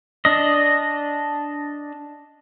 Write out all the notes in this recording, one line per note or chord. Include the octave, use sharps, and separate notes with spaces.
D4 D#5